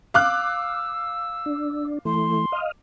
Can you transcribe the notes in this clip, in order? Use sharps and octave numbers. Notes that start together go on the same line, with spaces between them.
F5 D6 E6 F#6
D4
E3 A3 C6
D#5 F5